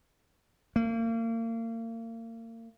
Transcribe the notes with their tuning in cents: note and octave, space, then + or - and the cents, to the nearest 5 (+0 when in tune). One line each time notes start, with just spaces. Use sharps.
A#3 -35